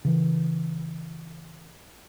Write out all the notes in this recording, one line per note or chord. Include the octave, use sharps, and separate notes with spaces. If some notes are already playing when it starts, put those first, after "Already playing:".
C#3 E3